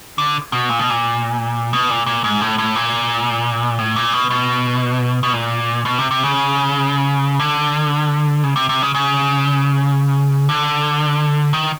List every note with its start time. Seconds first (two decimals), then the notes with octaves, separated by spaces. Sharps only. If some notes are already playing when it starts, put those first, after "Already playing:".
0.18 D3
0.52 B2
0.69 A#2
0.79 B2
0.90 A#2
1.73 B2
1.90 A#2
2.06 A#2
2.24 G#2
2.41 A2
2.58 A2
2.76 A#2
3.78 A2
3.96 A#2
4.13 B2
4.30 B2
5.23 B2
5.33 A#2
5.85 B2
5.99 C3
6.11 C3
6.23 C#3
7.39 D3
8.44 C#3
8.56 C3
8.69 C3
8.82 C#3
8.94 C#3
10.49 D3
11.53 D#3